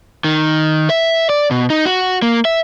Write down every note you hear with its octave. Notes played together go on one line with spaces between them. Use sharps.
D#3
E5
D5
B2
D#4
F#4
A#3
E5